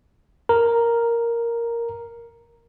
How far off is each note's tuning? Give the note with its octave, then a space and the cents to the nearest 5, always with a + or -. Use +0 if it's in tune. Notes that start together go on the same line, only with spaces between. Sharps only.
A#4 +0 A#5 +0